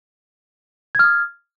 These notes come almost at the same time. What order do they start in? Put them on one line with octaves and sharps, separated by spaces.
G#6 F6 D#6